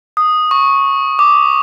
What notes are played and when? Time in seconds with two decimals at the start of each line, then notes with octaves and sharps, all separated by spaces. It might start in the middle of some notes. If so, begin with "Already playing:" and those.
0.17 D#6
0.51 C#6
1.19 D6